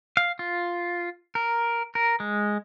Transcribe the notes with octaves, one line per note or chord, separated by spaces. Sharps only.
F5
F4
A#4
A#4
G#3